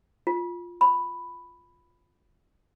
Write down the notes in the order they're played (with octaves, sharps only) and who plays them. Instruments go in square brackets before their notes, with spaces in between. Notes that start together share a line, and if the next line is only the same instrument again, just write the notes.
[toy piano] F4
B5